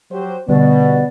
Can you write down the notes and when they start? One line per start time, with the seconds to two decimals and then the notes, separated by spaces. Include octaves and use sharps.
0.12 F#3 G4 C5
0.49 B2 D3 G3 B3 D5